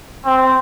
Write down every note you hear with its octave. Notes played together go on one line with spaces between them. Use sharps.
C4